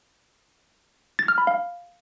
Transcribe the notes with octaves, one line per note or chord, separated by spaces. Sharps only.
A6
F6
B5
F5